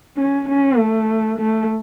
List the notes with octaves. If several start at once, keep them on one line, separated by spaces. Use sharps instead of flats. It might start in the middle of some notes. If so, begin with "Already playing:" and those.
C#4
C#4
A3
A3